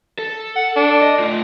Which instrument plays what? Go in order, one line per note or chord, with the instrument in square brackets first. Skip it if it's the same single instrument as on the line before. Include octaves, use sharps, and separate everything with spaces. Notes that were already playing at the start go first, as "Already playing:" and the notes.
[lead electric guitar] A4
[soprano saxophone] F#5
D4
[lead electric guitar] D#5
A3 F4